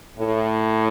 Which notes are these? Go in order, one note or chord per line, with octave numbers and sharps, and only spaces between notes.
A2